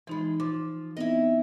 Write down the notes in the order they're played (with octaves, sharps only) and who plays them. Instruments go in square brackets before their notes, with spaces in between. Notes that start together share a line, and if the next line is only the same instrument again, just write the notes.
[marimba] E3 D#4 B5 [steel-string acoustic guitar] F3 G#3
[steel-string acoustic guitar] F3 [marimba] D6
[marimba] B3 C4 D#4 [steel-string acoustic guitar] E4 D#5